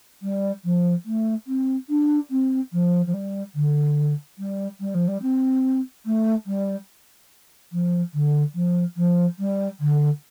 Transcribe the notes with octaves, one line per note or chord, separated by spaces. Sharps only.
G3
F3
A3
C4
D4
C4
F3
F3
G3
D3
G3
G3
F3
G3
C4
A3
G3
F3
D3
F3
F3
G3
D3